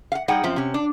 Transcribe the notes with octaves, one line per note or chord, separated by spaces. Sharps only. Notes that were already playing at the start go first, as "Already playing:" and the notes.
F5 F#5
G3 D#4 G#4 F#5 G5
F#2 F3 C4
C3 C#4
D4